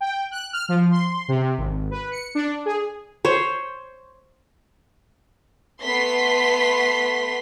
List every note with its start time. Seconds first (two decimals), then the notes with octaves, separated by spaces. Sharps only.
0.01 G5
0.31 F#6
0.53 F6
0.69 F3
0.91 C6
1.28 C3
1.58 G#1
1.91 B4
2.11 C#7
2.35 D4
2.66 G#4
3.25 C5 C#5
5.82 A3 B3 C6 B6